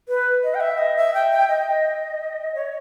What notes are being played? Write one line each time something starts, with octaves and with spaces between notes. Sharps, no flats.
B4
D#5
G5
E5
D#5
E5
G5
G5
D#5
C#5